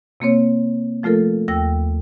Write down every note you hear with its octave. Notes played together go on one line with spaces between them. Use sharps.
C3 A#3 C4 C#5
F3 A3 F4 A4 A#4
D#2 G5 E6 A#6